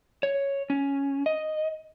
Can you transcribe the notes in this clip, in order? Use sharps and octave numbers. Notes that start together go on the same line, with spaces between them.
C#5
C#4
D#5